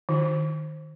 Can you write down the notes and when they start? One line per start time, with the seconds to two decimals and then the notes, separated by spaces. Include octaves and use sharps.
0.09 D#3